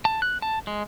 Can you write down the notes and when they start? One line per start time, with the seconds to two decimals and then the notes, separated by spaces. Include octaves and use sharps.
0.05 A5
0.22 F#6
0.42 A5
0.67 G#3